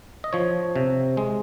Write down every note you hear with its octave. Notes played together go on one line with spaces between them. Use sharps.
D#5
F3 C#5
C3
G#3